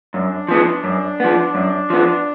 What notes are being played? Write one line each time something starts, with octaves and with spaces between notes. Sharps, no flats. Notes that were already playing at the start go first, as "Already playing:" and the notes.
F#2 D4
F3 B3
F#2
F3 B3
F#2
F3 B3